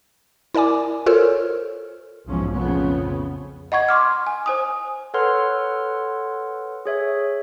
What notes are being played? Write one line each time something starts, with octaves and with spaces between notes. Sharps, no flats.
E4 A#4 D5 G#5 D6
F4 A4 A#4 C5 C#5 F6
B1 E2 G#2 F3 C#4
A1 F2 C#3 F3 B3
D#5 F#5 C#6 G#6
C6 D6 F6
G#5
C5 G#5 D#6
A4 B4 C#5 F#5 C6 F6
G#4 C#5 E5